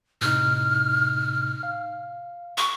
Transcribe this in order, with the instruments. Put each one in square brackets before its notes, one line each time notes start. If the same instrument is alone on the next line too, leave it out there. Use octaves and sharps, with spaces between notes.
[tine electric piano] A2 C3 D#4 [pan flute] F6
[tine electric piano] F5
[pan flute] C#6